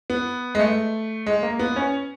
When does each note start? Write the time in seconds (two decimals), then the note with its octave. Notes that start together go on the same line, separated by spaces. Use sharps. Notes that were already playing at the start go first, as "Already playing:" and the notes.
0.10 B3
0.55 G#3
0.59 A3
1.26 G#3
1.43 A#3
1.59 B3
1.76 C#4